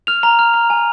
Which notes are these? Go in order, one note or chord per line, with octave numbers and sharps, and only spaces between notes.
F6 F7
A#5 F7
F6
A#5
G#5